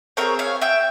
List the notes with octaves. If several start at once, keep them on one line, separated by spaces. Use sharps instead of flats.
C4 E4 G#4 A#4 C#5
C#5 F5
E5 G5